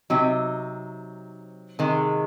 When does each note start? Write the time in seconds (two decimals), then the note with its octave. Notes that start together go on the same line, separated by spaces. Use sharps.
0.10 C3 F#3 C4 D#4
1.79 C3 D#3 G#3